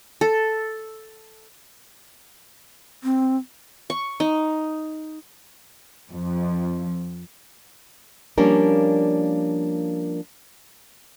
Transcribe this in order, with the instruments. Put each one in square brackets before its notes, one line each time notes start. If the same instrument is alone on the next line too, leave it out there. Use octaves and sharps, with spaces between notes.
[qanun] A4
[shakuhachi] C4
[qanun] C#6
D#4
[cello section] F2
[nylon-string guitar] F3 G3 A#3 C#4 D4 A#4